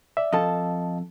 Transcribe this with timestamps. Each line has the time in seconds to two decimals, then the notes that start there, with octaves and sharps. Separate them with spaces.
0.17 D5 E5
0.33 F2 A4 D#5 F5 A5